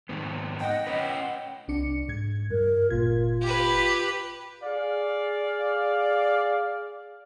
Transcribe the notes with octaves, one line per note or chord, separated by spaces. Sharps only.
G#2 D#3 B3
D#5 F#5 G5
C#4 B4
C2 D4 C#7
G#2 G#6
G2 A#4
G1 A#2 F4 G#6
G4 B4
G#4 D5 F5